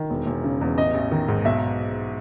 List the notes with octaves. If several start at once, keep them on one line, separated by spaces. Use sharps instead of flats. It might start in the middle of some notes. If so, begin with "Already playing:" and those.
Already playing: D#3
E1
E1
C#3
E2
A1 D#5
A1
D#3
G#2
B1 E5